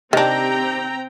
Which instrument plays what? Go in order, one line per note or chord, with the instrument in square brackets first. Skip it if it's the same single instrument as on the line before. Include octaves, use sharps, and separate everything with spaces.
[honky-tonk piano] C3 [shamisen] D#3 D4 [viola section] C4 G5 A#5